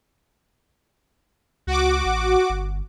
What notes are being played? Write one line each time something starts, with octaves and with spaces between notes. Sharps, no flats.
C#2 F#4 D6
A1
G1